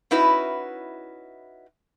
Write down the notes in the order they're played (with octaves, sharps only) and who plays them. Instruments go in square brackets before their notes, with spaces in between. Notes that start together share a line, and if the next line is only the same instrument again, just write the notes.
[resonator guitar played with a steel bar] C#4 D#4 E4 F#4 B4